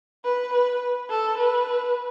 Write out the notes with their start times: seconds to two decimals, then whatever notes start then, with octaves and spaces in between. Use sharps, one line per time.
0.25 B4
0.53 B4
1.10 A4
1.38 B4